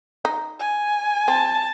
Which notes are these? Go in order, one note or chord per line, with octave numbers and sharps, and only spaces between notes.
D#4
G#5
C4 A5